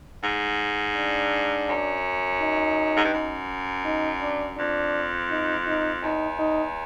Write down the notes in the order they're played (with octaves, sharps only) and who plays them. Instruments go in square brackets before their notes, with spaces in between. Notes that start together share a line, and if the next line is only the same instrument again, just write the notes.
[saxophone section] G#2
[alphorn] D4
[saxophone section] F#2
[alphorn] D#4
[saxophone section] G#2
G2
F#2
[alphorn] D#4
D4
[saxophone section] F2 [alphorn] D4
[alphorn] D#4
D#4
[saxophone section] E2 [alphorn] D#4
[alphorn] D#4